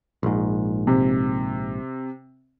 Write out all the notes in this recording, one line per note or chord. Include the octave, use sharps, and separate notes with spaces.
A#1 G#2
C3